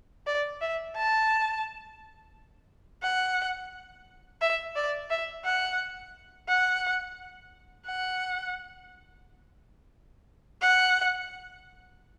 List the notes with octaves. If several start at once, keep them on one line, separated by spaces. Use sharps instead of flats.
D5
E5
A5
F#5
E5
D5
E5
F#5
F#5
F#5
F#5